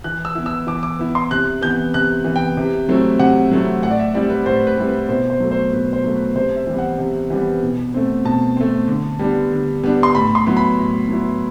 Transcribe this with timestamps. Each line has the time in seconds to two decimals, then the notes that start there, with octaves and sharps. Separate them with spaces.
0.04 E3 F#6
0.25 E6
0.35 B3 E4
0.46 E6
0.67 E3 D6
0.83 D6
0.99 B3 E4
1.15 C6
1.31 C3 F#6
1.61 E3 B3 G6
1.94 C3 F#6
2.25 E3 B3
2.36 G5
2.57 C3
2.89 F#3 A3 C4 E4
3.19 C3 F#5
3.51 F#3 A3 C4 E4
3.83 A2 F#5
3.91 D5
3.99 E5
4.14 G3 C4 E4 D5
4.30 B4
4.46 A2 C5
4.67 B4
4.78 G3 C4 E4
4.88 B4
5.09 B2 C5
5.30 C5
5.40 F#3 A3
5.51 C5
5.73 B2 B4
5.93 C5
6.04 F#3 A3
6.15 B4
6.35 C3 C5
6.56 E5
6.67 E3 G3 B3
6.78 F#5
6.98 C3
7.30 E3 G3 B3
7.63 B2
7.94 A3 C4
8.25 B2 A5
8.57 A3 C4
8.88 D3
9.19 G3 B3 D4
9.51 D3
9.83 G3 B3 D4
10.03 C6
10.15 A2 B5
10.35 C6
10.47 F#3 B3 E4
10.57 B5
10.78 A2
11.09 F#3 B3 E4